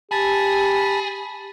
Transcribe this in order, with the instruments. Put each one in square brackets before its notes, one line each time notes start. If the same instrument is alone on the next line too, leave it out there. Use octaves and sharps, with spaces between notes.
[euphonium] G4 [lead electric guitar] G#4 [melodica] A5 B5